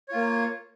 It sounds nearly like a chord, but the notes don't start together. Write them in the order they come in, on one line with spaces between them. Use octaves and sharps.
C#5 F4 A#3